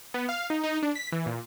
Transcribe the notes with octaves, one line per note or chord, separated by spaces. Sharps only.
B3
F5
D#4
D#4
D4
B6
E3
A#2